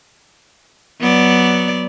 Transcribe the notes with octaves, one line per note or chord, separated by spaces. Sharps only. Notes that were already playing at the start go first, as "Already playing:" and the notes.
F#3 B3 D5